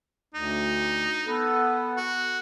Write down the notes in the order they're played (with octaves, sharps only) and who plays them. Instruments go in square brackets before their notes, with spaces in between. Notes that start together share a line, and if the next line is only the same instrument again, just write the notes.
[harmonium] D2 [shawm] D#4
[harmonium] B3 A4 B4
[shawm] F#4